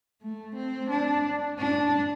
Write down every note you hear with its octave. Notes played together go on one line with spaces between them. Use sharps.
A3
C4
D4
D4